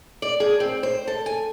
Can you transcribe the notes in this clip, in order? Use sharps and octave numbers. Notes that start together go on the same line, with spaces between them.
D5
G#4
C4
C5
A4
G#5